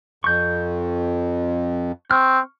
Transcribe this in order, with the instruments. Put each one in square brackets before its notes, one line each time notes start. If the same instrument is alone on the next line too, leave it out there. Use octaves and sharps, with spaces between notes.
[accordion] F2 [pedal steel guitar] C#6 G6
[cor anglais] C4 [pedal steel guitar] C#6 F6